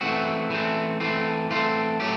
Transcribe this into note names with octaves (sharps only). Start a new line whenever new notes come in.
E3 A3 C4 F#4
E3 A3 C4
E3 A3 C4
E3 A3 C4 F4
A2 F#3 A3 G4